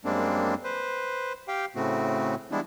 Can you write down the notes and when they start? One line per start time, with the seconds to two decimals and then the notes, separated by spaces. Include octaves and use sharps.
0.05 F#2 G3 G#3 A#3 C4 D4
0.64 B4 C5
1.48 G4 F5 G5
1.76 A2 C#3 A3 C4 F#4
2.51 E3 G3 G#3 B3 D4 E4